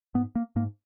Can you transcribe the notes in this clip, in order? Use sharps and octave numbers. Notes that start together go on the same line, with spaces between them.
G#2 B3
A#3
G#2 A#3